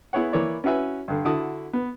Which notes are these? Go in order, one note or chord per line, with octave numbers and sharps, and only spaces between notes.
B3 E4 G#4 C#5 F#5
E3 A#3 E4 C#5 D5
C#4 E4 F#4 B4 E5 G#5
G2 D3
D3 E4 F#4 A5 D#6
B3